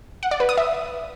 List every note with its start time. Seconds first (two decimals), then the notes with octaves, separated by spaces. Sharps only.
0.23 F#5
0.31 D5
0.40 B4
0.49 D#6
0.57 E5